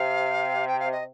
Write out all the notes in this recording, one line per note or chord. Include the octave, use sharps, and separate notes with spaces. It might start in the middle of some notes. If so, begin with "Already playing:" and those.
Already playing: C3 F5
G5
F5
D#5